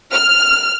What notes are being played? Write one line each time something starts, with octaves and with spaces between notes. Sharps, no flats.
F6